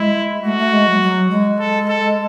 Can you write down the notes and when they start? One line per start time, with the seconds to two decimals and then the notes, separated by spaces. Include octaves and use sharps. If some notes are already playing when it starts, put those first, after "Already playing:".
Already playing: G#3 E4
0.44 A3 F#4
0.59 A3
0.73 G#3
0.88 F#3
1.02 F#3
1.30 G#3
1.60 A4
1.88 A4